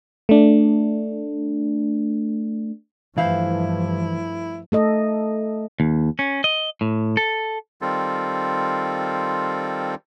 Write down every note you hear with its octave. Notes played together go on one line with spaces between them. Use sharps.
A3 D4
G2 E3 F3 A3 E4 C5 F5
A3 A4 D#5
D#2
C#4
D#5
A2
A4
D#3 G3 C4 F4 A4